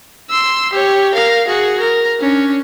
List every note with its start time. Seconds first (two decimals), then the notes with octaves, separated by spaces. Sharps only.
0.29 C6 E6
0.73 G4 C#5
1.14 A#4 F5
1.47 F#4 G#4
1.80 A#4
2.20 C#4 D4